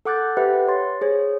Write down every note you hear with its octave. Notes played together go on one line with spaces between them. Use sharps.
A4 F#5 D6 F#6 G6 A6
G4 B4 C5 E5 F#5
C#5 C6 A6
G#4 C5 C#5